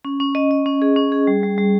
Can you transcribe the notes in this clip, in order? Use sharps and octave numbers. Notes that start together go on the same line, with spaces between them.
C#4
C#4
D#5
D#5
C#4
G#4
C#4
G#4
G3
G3
G3